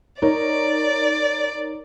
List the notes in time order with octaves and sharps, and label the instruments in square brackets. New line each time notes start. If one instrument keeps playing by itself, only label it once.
[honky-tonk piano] D#4 A#4 C#5 [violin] D5